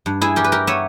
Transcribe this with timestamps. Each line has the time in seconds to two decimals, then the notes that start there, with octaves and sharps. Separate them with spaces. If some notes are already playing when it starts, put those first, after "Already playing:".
0.06 G2
0.21 E4 G#4
0.36 G3 G4 A#4
0.44 B4
0.52 G4 A#4
0.67 B3 C#5 E5